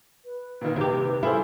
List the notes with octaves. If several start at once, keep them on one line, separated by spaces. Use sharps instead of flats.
B4
A#2 D#3
C3 D#3 G4
E4 F4 G#4 A4 C5